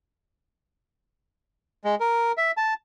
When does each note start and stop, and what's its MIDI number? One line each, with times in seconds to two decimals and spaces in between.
1.84 1.95 56
2.00 2.32 70
2.37 2.51 76
2.57 2.74 81